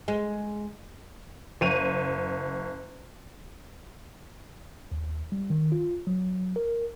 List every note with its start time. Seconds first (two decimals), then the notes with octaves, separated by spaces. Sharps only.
0.08 G#3
1.61 F#1 D#7 F7
4.92 D#2
5.32 G3
5.50 D#3
5.72 F4
6.07 F#3
6.56 A#4